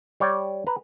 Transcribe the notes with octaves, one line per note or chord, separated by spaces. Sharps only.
G3 C#5 D5 G5
B4 A#5